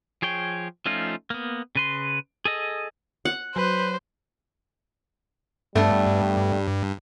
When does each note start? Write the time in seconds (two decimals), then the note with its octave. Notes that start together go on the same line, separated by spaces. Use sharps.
0.22 F3 G#4 C#5 G5
0.86 F3 A3 C#4 D#4 F4
1.30 A#3 B3
1.75 C#3 B4 C6
2.45 G#4 A4 D#5
3.25 F#5
3.56 F#3 B4 C5
5.75 G2 G3 A3 B3 D4